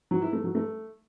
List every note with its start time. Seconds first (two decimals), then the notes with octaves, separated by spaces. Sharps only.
0.11 F#3
0.22 E4
0.33 A3
0.44 F#3
0.55 A3